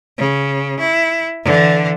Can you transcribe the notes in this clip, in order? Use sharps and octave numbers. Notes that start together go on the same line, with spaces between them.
C#3
E4
D3 E3